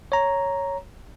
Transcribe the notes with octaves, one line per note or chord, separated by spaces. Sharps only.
C#5 A#5